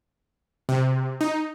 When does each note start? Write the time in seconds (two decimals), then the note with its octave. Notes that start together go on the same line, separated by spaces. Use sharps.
0.69 C3
1.21 D#4